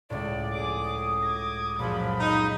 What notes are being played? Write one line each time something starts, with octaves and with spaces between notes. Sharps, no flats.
C#2 A2 D5
F2 G#4 D6
D#6
D6 G#6 A#6
F#2 A#2 C#3 F3 F#3 B5
D#4